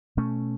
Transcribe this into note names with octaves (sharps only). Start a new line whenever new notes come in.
B2 A3 C#4